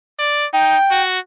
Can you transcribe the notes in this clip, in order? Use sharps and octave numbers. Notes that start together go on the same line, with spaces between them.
D5
D#4 G5
F#4